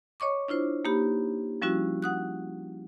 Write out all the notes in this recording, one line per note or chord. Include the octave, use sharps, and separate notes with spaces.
C#5 D#5 C#6 D6
D4 E4 F4 C5
A#3 D#4 G4 B5
F3 G3 C#4 E4 F#4
F#5 D#6 F#6